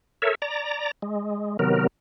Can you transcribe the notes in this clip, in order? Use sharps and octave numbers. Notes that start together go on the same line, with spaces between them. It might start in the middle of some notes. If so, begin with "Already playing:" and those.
A4 A#4 C#5 E5
D5 A#5
G#3
C3 D#3 F#3 B3 A#4